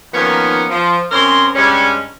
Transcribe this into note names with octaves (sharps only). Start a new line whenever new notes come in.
D#3 F3 A#3 B3 C#4 D#4
F3
F#2 C4 C#4 A#4 C6
G2 G3 G#3 C#4